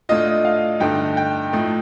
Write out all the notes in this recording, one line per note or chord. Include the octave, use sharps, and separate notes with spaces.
A2 A3 D4 F4 D#5
F5
G2 D3 A3 D#4 G5
G5
A2 F3 A3 D#4